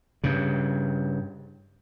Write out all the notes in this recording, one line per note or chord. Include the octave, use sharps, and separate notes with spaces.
G2 C#3